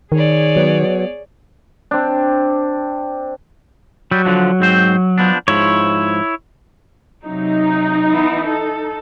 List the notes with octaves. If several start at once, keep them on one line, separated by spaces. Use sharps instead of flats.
D#3 G#4 C#5 D5
F#3 B3
C4 D4
F#3 G3
D3 F3 D4
G#2 C4 C5
F3 B3 D4
G#2 F3 E4 C#5
C3 F#3 D#4
E3 B3
A4